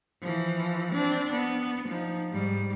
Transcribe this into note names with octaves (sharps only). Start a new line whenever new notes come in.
E3 F3
C4 D4
B3
F3 D#4
G#2 G3